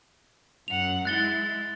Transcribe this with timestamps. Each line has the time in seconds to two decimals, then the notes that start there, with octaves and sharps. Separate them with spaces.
0.68 F#2 F#5 F7
1.05 G#3 E4 F#6 A6 G7